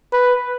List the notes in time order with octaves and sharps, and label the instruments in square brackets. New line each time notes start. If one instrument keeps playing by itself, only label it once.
[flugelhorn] B4